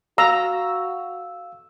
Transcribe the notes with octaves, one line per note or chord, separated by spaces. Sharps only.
F#4 F5 A#5 E6